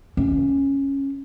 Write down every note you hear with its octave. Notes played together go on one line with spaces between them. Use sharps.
C#4